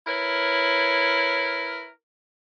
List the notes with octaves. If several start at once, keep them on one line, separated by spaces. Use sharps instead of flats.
E4 A#4 B4 C#5